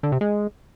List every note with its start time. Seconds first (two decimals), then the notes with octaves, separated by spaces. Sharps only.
0.03 D3
0.12 C3
0.21 G#3